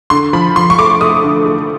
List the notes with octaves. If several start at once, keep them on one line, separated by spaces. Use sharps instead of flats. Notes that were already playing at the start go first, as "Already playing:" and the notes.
D3 C6
F3 B5
F3 C6
C#6
A3 D6
A3 D#6
D3
A3